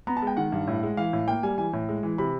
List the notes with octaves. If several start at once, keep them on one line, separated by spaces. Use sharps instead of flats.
B3 A#5
A5
G#3 G5
D#3 F#5
G2
A2
G#3
E3 F5
A2
A#3 G5
G3 G#5
E3 G#5
A2
G#3
E3
C3 B5